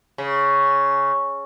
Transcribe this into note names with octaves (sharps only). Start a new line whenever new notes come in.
C#3